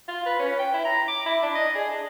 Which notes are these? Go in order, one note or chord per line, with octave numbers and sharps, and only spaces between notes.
F4
B4
C#4
G5
E4
A#5
D6
E4
D4
D#5
G#4
D4